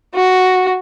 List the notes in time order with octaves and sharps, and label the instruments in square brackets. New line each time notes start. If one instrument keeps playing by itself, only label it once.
[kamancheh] F#4